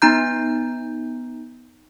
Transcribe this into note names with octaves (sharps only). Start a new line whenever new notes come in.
B3 D#4 A#5 G6